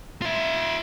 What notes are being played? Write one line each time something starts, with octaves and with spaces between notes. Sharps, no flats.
F4 E5